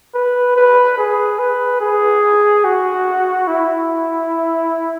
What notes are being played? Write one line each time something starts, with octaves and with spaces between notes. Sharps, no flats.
B4
B4
G#4
B4
G#4
F#4
E4